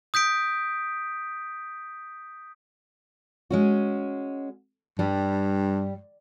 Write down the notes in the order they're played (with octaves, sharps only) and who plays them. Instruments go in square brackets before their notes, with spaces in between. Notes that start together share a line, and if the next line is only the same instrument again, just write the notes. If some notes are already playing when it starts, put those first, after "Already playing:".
[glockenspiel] D#6 G6 B6 D7
[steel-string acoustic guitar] G#3 C#4 F#4
[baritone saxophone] G2 [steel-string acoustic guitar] G3